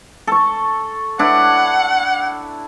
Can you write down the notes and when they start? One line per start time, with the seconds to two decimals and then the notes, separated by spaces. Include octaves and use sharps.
0.27 A4 C#6
1.19 D4 E4 F#5